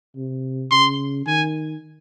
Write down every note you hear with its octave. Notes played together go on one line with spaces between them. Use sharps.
C3
C#3 C6
D#3 G#5